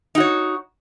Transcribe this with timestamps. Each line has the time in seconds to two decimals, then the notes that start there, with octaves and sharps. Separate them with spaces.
0.15 D#4
0.18 F#4
0.20 C#5